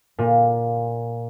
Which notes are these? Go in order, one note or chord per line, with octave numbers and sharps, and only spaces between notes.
A#2